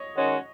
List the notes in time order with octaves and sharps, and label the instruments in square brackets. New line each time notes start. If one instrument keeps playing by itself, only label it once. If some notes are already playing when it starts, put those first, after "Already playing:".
Already playing: [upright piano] C#5 D#5
[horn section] D#3 G#3 C#4 F#4